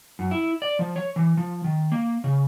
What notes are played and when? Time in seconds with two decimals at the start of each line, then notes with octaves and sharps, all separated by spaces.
0.19 F#2
0.31 E4
0.62 D5
0.79 F3
0.96 C#5
1.16 E3
1.37 F3
1.64 D#3
1.92 A#3
2.24 C#3